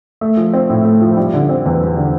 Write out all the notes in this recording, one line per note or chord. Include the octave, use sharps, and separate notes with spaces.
A3
F3
C4
A2
A3
F3
G3
D3
C4
E2
G3
D3